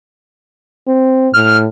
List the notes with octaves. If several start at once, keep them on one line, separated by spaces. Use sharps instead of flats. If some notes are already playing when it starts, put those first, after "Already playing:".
C4
A2 F6